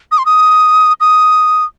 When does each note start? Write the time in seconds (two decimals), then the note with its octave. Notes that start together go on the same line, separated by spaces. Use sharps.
0.12 D#6
0.18 C6
0.26 D#6
1.00 D#6